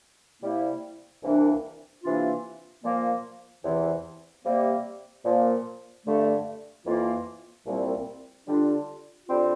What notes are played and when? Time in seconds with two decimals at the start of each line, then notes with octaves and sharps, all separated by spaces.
0.42 C3 G3 A#3 E4
1.23 C2 C3 E3 A#3 D4
2.03 C3 E3 A#3 D4 F4
2.84 A#2 F3 A#3
3.64 E2 C3 E3
4.45 C3 G3 A#3
5.25 A#2 F3 A#3
6.06 G2 D3 A3
6.86 F2 E3 A#3 F4
7.66 C2 A#2 G3 C4
8.47 D3 G3 D4 F4
9.27 D3 G3 C4 F4